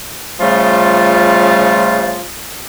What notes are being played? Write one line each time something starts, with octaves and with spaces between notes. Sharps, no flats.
C#3 F3 G3 A3 F4